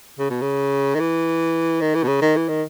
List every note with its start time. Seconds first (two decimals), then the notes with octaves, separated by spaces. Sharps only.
0.19 C#3
0.30 B2
0.42 C#3
0.95 D#3
1.00 E3
1.81 D#3
1.95 E3
2.03 B2
2.08 C#3
2.22 D#3
2.37 E3
2.49 D#3